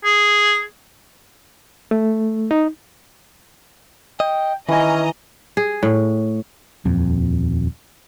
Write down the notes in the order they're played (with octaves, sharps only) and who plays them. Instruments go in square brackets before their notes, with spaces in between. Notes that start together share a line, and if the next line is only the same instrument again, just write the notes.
[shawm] G#4
[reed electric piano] A3
D#4
[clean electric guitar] D#5 [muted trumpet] G5
[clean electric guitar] D#3 [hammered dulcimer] E3 G#5 [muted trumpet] C#4 [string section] D#5 A#5
[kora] G#4
A2
[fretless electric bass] D#1 F2